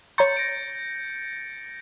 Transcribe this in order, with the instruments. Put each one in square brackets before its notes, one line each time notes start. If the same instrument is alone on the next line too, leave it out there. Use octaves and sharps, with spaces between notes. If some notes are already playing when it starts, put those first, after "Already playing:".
[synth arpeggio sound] C#5 A#5 C6 [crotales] G6 A6 C#7
[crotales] A#6 D7